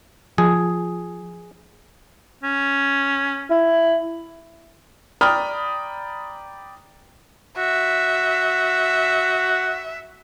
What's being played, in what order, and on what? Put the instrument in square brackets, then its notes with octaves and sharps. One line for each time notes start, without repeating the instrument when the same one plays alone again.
[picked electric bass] F3 [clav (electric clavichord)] G#4
[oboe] C#4
[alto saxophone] E4
[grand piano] D5 G5 A#5 B5 D#6 F6
[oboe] F#4 [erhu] E5